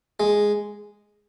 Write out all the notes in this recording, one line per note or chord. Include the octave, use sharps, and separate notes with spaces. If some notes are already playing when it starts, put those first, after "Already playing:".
G#3